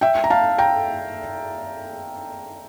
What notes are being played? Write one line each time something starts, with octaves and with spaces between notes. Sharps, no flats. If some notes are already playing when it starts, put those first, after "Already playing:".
E5 G5
A#5
F5 A5
G5 A#5